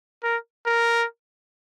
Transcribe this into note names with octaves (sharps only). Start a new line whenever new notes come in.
A#4
A#4